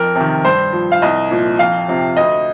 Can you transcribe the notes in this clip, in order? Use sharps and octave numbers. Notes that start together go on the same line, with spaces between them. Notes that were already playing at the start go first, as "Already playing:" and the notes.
Already playing: F2 A#4
C3 D#3
G2 C5
F3
F5
C2 D#5
A#2 F3
F2 F5
C3 F3
D2 D#5